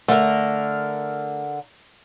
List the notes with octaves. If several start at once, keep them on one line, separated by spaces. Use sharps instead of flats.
D3 A3 A#4